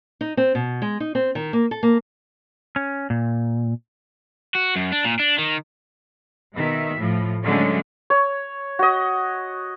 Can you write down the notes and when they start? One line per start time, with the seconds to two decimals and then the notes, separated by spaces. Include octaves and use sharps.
0.21 D#4
0.37 C4
0.55 B2
0.82 G#3
1.00 D#4
1.15 C4
1.35 D#3
1.53 A#3
1.71 A4
1.83 A#3
2.76 C#4
3.10 A#2
4.55 F#4
4.76 F#2
4.92 D4
5.04 A#2
5.19 D4
5.38 D#3
6.54 B2 D#3 E5
6.98 A2 F3
7.44 D3 F#3 G#3 A3 C#4
8.10 C#5
8.79 F#4 D#5